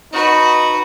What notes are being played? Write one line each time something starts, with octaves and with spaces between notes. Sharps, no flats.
D#4 F#4 B4